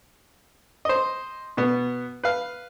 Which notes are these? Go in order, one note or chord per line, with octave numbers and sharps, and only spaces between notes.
C5 D#5
B2 B3
B4 F5